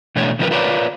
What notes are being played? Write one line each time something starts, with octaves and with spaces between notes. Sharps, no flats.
B2 E3 A3 D4 C#5
C#3 F3 A#3 C#4 A#4 B4
F4 A#4 B4 C#5 D5